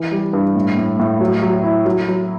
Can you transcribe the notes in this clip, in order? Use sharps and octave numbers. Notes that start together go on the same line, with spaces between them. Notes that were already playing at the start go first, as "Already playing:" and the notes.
Already playing: E3
G3
G2
A2
A2
A2
F#3
F#3
E4
F#3
F#3